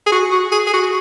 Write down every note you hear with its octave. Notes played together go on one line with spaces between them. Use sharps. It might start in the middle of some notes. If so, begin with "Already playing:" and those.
G#4
F#4
F#4
G#4
G#4
F#4